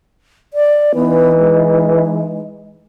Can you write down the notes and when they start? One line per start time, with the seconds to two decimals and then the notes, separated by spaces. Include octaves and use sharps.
0.54 D5
0.95 E3 B3 D#4
1.38 G#3